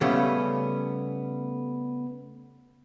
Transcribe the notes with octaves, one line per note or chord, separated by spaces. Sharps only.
C#3 G3 A3 B3 C#4